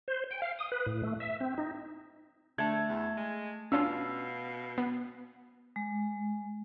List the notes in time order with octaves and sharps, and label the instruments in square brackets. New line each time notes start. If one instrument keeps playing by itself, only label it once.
[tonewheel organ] C5
G5
F5
D#6
B4
A2
A3
E5
C4
D#4
[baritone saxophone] D3 [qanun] A3 [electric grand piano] A5 G#6
[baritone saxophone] E2
G#3
[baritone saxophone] B2 [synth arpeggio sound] C#4 D4 F4 [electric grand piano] F5 E6
[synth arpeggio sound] B3
[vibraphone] G#3